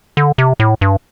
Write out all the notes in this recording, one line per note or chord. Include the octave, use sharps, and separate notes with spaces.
D3
C3
A2
G2